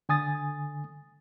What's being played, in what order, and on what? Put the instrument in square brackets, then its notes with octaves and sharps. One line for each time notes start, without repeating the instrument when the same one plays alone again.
[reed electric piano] D3 G#5 D#6 A6